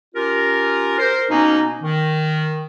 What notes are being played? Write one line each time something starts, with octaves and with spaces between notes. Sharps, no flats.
C#4 F4 G4 A#4
A#4 C5
B2 A#3 B3 C#4 D#4
D#3